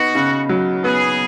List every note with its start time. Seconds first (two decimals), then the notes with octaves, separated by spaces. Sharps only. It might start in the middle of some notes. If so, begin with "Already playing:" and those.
Already playing: B3 D#4 F#4
0.15 C#3
0.49 F#3
0.84 B3 G#4